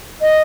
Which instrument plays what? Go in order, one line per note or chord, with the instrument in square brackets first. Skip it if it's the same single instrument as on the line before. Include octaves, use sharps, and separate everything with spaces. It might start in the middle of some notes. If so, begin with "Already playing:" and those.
[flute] D#5